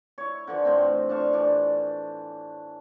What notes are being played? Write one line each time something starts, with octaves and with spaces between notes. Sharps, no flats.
E4 C#5
D3 E3 F3
A2 C4
D4 C5 F5 C#6
E3 D4 D5